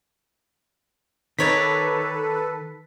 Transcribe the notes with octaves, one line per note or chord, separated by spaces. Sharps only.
D#3 D#4 A4 B4 C#5 D5 B6